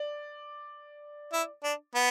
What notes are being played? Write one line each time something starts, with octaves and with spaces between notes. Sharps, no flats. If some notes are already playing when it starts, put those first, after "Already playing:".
Already playing: D5
E4
D4
B3